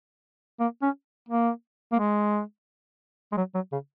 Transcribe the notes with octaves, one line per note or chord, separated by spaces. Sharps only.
A#3
C#4
A#3
A#3
G#3
G#3
F#3
F#3
C#3